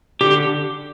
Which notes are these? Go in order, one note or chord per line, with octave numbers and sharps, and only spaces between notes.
D3 G4